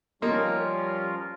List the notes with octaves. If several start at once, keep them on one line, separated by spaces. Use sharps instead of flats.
F3 G3 A#3 C#4 D#4 F4 A#4